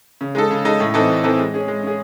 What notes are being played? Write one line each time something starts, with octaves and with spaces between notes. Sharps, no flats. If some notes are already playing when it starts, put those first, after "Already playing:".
C#3
G#3 D#4 A4
C#3
G#3 D#4 A4
A2
E3 C4 D#4 A4
A2
E3 C4 D#4 A4
G#3
C#4 G#4
G#3
C#4 G#4